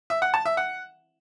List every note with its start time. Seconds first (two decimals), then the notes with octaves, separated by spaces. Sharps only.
0.10 E5
0.22 F#5
0.34 A5
0.45 E5
0.57 F#5